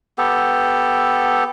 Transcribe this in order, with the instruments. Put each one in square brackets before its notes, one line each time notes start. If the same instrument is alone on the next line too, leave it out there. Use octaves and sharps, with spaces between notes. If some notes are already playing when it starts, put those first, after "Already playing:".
[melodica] B3 G4 A4